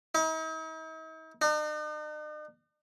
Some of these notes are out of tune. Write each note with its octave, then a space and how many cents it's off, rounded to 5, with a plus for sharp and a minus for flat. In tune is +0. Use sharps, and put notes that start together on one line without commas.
D#4 +45
D#4 -45